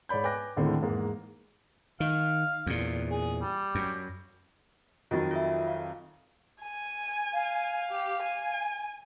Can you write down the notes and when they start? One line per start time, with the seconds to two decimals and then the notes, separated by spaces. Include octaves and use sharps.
0.09 G#2 C#5 D5 B5 G6
0.23 B4 G5 G#5 D6 F#6 A#6
0.56 D#2 A2 D3 D#3 G#3 C4
0.82 E2 G#2 A#3
2.00 D#3 F5
2.66 E2 A#2
3.11 G#4
3.41 G3
3.75 F#2
5.11 F2 D#3 F#3 F4 A6
5.31 F4 A4 E5
5.67 F5
6.62 G#5
7.33 F5
7.91 G4
8.23 G#5